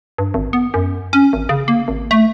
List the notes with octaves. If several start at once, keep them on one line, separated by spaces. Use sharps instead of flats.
G2
G#1
B3
F#2
C#4
G#1
C#3
A#3
G#1
A3